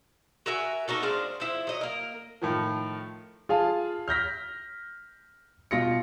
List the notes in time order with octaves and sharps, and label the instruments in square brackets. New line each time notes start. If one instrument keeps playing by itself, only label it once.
[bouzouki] F#4 A#4 E5 G#5
A#3 D#4 F#4 A4
G#3 D4 C5 F5
F3 E4 C5
F#3 D#5
A#3 A#4
[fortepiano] A2 D#3 F3
[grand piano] F4 G#4 F5 A5
F6 G6 A#6 B6
B2 F4 A#6 C#7